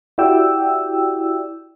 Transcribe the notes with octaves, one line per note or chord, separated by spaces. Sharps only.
E4 F#4 G4 D5 G5 E6